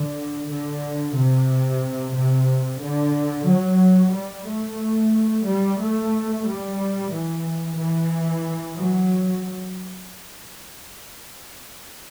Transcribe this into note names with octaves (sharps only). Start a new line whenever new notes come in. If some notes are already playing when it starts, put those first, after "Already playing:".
Already playing: D3
D3
C3
C3
D3
F#3
G3
A3
G3
A3
G3
E3
E3
F#3